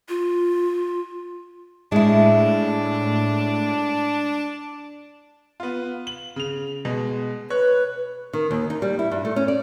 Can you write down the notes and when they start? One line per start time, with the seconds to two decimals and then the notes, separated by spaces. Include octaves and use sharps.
0.09 F4
1.92 A2 G#3 D4 E4
5.60 B3 F4
6.07 F#7
6.36 C#3 F7
6.85 B2 G#3
7.50 B4 C#5 C#6 F#6
8.33 D#3
8.51 D#2
8.70 D#4
8.82 G3
8.99 E4
9.11 G2
9.25 A3
9.36 C#4
9.48 D5